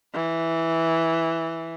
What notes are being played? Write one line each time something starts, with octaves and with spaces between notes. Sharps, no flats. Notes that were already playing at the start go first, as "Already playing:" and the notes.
E3